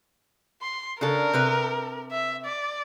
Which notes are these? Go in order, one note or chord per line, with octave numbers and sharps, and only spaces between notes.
C6
C#3 D4 A4 A#4
C3 B4 G5
E5
D5